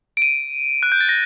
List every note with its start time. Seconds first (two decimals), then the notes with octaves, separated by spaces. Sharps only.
0.17 D7
0.22 D#7
0.83 F#6
0.92 G6
1.01 A6
1.09 A#6